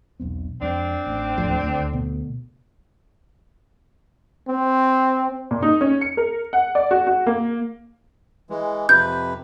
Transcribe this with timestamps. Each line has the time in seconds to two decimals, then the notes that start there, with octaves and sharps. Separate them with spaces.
0.20 E1 B1 C4
0.62 F2 G#3 C4 D4
1.07 A1
1.38 D1 D#2 A2 F3
1.63 D2
1.93 B2
4.48 C4
5.51 A#2
5.62 D#4
5.81 C#4
6.01 C#7
6.17 A#4
6.53 F#5
6.75 D5
6.91 F#4
7.07 F#4
7.27 A#3
8.50 E3 G#3
8.89 F2 C3 B4 G6